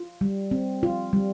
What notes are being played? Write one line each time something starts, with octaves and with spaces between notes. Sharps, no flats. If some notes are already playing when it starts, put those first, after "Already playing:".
Already playing: F4
G3
C4
F4
G3